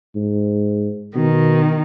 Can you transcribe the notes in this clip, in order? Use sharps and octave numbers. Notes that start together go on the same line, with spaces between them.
G#2
B2 D#3